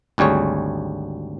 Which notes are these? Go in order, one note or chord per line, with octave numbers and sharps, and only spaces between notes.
G#1 D2 G3 G#4 C#5